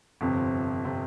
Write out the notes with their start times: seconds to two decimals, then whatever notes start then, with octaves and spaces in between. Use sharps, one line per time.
0.21 G1 F2 C3
0.85 C3